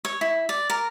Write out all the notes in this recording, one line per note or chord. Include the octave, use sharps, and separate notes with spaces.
C#5
E4
D5
A#4